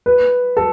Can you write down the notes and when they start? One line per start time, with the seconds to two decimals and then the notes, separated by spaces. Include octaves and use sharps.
0.06 B4
0.57 A4